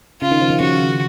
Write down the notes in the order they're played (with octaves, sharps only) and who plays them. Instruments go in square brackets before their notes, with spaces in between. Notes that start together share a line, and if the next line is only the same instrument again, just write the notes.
[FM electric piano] C#3 [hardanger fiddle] F4
[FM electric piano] D#3
F3
D#3
[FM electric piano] C#3 [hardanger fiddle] F#4